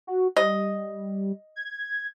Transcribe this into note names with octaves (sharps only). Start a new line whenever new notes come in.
F#4
G3 D#5
G#6